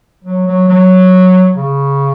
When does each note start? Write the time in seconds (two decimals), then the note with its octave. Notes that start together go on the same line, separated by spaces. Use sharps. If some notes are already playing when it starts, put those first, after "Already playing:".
0.25 F#3
0.47 F#3
0.68 F#3
1.56 C#3